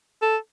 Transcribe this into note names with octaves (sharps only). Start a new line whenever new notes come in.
A4